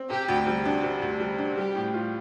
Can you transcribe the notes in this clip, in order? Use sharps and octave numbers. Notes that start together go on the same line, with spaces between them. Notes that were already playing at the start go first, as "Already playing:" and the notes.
Already playing: C4
C3 G4
D2
G3
D4
C3
D2
G3
D4
G3 G4
A2
F4